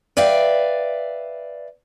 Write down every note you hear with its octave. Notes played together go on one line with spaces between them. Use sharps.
B4 D5 E5 F5 G5